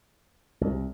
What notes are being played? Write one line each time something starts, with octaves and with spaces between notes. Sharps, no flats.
C2